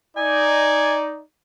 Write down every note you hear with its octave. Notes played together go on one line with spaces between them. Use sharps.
D#4 D5 G#5